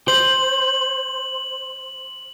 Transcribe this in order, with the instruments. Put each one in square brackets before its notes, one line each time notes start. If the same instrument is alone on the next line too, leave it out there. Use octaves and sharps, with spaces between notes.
[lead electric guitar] C5 [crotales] F#7